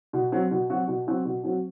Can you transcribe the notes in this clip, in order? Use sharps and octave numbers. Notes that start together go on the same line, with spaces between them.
B2
F#3 C4 F#4
B2
F#3 C4 F#4
B2
F#3 C4 F#4
B2
F#3 C4 F#4